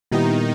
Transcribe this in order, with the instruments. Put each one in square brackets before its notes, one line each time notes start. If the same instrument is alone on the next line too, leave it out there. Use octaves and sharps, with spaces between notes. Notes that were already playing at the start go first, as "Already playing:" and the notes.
[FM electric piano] A#2 G3 B3 E4 G4 [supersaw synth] D#3 D#4